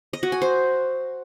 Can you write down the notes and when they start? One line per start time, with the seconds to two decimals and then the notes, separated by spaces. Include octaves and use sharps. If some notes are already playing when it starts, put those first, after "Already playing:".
0.13 D#5
0.23 F#4
0.32 G#5
0.42 C5